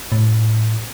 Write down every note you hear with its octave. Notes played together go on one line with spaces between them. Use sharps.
A2